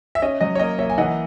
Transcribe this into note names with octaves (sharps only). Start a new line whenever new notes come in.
E5
C#4 D#5
F#3 D#5
C#5
A#3 D#5
A#3 C#5 E5
G#5
E3 D#5 F#5